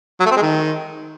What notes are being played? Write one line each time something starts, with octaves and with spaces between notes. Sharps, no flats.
F#3
A3
C4
G#3
D#3